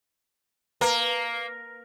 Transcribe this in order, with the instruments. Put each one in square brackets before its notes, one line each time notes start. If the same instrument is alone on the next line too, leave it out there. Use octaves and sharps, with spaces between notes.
[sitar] A#3 [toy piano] B4 A5 A#5